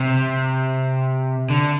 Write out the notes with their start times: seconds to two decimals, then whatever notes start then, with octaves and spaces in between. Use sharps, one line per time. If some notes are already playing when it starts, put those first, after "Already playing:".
Already playing: C3
1.50 D3